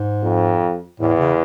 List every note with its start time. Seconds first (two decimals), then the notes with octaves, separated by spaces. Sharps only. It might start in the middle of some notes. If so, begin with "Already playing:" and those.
Already playing: G#2
0.22 F2
1.00 E2 A2
1.19 C#3